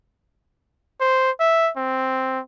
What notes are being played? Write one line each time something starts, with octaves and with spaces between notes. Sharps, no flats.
C5
E5
C4